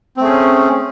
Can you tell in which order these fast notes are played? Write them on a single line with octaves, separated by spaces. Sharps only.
C4 A3 G#4 C#4